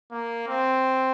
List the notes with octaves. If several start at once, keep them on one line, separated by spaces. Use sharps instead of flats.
A#3
C4